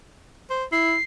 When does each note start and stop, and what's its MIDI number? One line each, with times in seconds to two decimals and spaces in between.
0.50 0.65 72
0.72 0.95 64
0.72 1.03 96